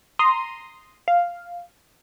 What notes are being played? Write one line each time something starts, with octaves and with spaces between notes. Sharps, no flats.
A#5 C6 D#6
F5